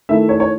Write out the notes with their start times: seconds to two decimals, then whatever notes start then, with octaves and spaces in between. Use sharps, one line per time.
0.09 D#3 A3 E4 E5
0.29 C#5
0.40 C#5